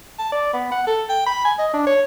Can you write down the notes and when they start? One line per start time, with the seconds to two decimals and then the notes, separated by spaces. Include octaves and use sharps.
0.19 A5
0.32 D5
0.53 B3
0.72 F#5
0.87 A4
1.09 G5
1.27 B5
1.45 G#5
1.59 D#5
1.74 D4
1.87 C#5